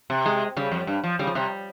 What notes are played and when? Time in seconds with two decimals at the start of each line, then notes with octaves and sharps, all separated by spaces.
0.10 C3
0.26 G#3
0.57 C#3 G3
0.72 F2
0.87 G2
1.04 F3
1.19 C#3 G3
1.27 F3
1.35 C3 G3